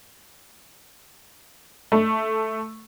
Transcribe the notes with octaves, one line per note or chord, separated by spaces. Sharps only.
A3